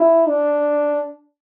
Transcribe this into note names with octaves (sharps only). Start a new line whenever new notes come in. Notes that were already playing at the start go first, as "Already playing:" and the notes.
Already playing: E4
D4